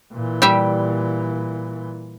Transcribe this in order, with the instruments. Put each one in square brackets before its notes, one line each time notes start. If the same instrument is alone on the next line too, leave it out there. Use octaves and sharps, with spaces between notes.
[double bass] A#2 E3
[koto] G3 G4 E5